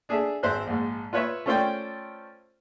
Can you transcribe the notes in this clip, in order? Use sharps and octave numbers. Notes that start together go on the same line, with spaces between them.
D4 G#4 A4 E5
G#1 C5 E5 F#6
A#1 G#2
F4 B4 C#5 E5
A3 C#4 F4 C5 D5 G5